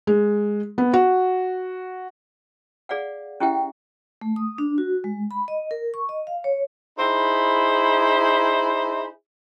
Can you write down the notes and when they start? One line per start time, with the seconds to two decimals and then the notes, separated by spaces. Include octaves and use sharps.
0.07 G#3
0.78 B3
0.93 F#4
2.89 G#4 D5 F5 F#5
3.40 C#4 E4 G4 E5 F#5 G5
4.21 A3
4.36 D#6
4.58 D4
4.78 F#4
5.04 G#3
5.31 B5
5.48 D#5
5.71 A#4
5.94 C#6
6.09 D#5
6.27 F5
6.44 C#5
6.98 D#4 E4 G#4 C5 B5